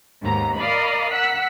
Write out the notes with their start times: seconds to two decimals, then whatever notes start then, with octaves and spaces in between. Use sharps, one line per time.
0.22 D#2 G#2 B3 A#5
0.57 A#4 D5 D#5 F5 B5
1.11 F#5 E6 F#6 B6